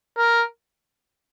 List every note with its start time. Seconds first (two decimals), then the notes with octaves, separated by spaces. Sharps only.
0.17 A#4